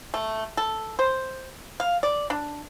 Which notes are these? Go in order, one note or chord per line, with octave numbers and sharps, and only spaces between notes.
A3
A4
C5
F5
D5
D4